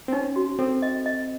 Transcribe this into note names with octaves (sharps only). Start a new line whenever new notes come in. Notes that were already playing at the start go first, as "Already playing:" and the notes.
C4
C#4 D#4
F#4
C4 A4
D#5
D#5